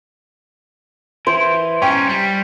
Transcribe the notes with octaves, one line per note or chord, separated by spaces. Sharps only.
E3 C5
C#4 D#4 G5 C#6
G3